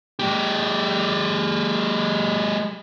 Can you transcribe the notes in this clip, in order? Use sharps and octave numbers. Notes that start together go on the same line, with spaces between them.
G#3 G4